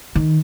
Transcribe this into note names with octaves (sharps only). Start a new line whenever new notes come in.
D#3